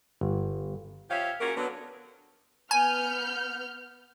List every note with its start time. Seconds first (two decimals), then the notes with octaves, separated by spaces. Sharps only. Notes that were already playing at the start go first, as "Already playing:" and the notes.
0.21 G1
1.10 F3 G4 C#5 E5 F5
1.41 A#3 C#4 F4 F#4 G#4 A#4
1.57 D3 F#3 B3
2.71 B3 G#5 F6 G6